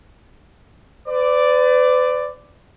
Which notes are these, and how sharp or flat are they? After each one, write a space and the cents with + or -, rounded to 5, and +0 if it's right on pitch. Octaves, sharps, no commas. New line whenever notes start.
B4 +40 D5 +0